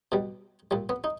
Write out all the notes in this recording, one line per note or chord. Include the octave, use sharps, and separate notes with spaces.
B2 G3
A#2 G3
B3
D#4